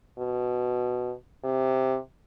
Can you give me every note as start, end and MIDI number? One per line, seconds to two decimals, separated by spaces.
0.19 1.13 47
1.44 1.97 48